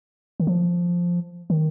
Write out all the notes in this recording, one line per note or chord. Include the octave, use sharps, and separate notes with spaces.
D#3
F3
D#3